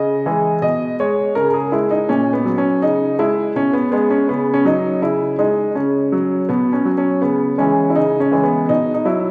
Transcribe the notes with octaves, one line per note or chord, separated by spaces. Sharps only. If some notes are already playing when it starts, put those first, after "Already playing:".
Already playing: C#3 D#5
E3 G#3
B2 D#5
G#3 C#5
C#3 A#4
A#4
G#4
G#3 E4
D#4
A#2 C#4
B3
F#3
C#4
C#3 D#4
G#3 E4
B2 C#4
B3
G#3 B3
C#4
C#3 B3
C#4
F#3 D#4
C#3 E4
G#3 D#4
C#3 C#4
F#3
B2 B3
C#4
F#3
C#4
C#3 B3
E3 G#3 C#4
E4
C#3 D#4
C#4
E3 G#3
B3
B2 D#4
D#4
F#3 E4